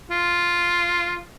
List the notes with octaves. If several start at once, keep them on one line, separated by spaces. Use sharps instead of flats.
F4